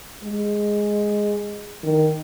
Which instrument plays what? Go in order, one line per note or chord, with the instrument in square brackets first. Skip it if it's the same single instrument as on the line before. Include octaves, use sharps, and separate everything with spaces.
[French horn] G#3
D#3